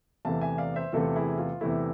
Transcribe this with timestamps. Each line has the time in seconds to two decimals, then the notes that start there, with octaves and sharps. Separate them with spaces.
0.25 E2 C3 E3 A3 F5 A5
0.41 E5 G#5
0.58 D5 F5
0.76 C5 E5
0.92 E2 C3 E3 A3 F4 A4
1.16 E4 G#4
1.38 F4
1.61 E2 C3 E3 A3 E4